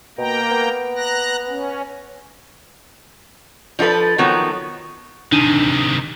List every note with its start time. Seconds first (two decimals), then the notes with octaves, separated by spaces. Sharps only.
0.18 B2 A#3 G5 A#5
0.51 B3
0.96 A#5 F#6 A#6
1.49 C#4
3.79 F3 D#4 F4 A4 B4
4.18 D#3 F3 F#3 B3
5.32 C3 D#3 D4 D#4 D#7